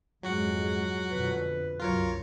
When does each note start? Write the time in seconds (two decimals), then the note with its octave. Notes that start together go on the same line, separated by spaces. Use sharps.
0.23 F2 G#2 F#3 G#3 F#4 F#5
1.11 F2 B2 D3 B4
1.80 C2 F#2 F#3 F4 A#4 C#5